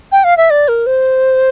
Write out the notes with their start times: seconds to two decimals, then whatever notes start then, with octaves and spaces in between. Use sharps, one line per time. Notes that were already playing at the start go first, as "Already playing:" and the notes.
0.12 G5
0.24 F5
0.37 E5
0.50 D5
0.68 A#4
0.86 C5